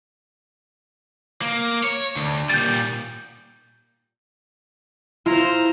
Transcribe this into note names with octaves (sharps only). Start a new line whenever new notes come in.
A#3
C#5
D2
A#2 G3 G6 A6
E4 F4 C5 A#5